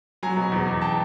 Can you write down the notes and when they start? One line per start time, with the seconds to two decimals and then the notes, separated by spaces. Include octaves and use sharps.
0.23 F#3 G#5 A#5
0.37 B2
0.52 E2
0.67 E2
0.82 G5 A5